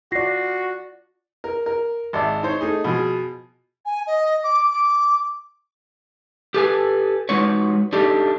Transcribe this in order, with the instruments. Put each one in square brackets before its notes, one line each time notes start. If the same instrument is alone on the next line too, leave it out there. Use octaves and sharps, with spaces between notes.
[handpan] F4 D5 [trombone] F#4 [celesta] A#6 C7
[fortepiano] A#4
A#4
G#1 D5 E5
D#4 C5 C#5
A3 D#4 G#4
B2 F3 G#4
[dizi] G#5
D#5
D6
D6
[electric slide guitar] G4 A4 B4 G5 G#5
G#3 D#4 F4 F#4 B4 C#5
D4 D#4 G4 A4 D#5